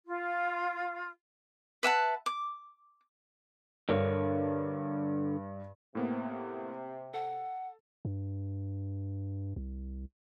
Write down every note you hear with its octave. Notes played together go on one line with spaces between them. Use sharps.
F4
B4 E5 F#5 A5
D6
G2 D3 A#4 C#5
A2 C3 A#3 B3
A4 F#5
G2
C2